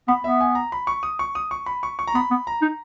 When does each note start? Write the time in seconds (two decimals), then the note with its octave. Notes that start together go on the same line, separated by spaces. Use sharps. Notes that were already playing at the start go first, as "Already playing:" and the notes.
0.08 B3 B5
0.24 B3 E5
0.40 G#5
0.55 A#5
0.72 B5
0.87 C#6
1.03 D#6
1.19 C#6
1.35 D#6
1.51 C#6
1.66 B5
1.83 C#6
1.99 C#6
2.07 A#5
2.15 B3 B5
2.31 B3
2.47 A#5
2.62 D#4